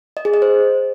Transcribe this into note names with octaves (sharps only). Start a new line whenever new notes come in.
D#5
G#4
D#5
C5